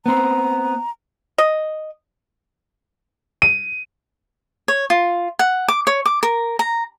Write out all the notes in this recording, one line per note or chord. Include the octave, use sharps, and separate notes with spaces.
B3 C4 A#5
D#5
D#7
C#5
F4
F#5
D6
C#5
D6
A#4
A#5